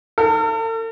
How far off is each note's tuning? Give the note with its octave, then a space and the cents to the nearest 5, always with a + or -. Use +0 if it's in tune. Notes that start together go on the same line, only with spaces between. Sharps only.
A4 +45